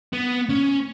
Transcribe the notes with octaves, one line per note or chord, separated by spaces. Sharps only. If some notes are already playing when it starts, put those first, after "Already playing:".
B3
C#4